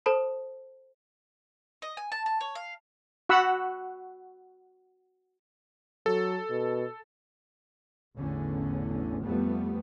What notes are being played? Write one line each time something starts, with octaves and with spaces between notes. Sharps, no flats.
A4 C5 A5 B5 D#6
D#5
G#5
A5
A5
C#5
F5
F#4 F#5 B5 E6
F#3 A4
B2
A1 E2 D3 C#4
F2 G3 A3 B3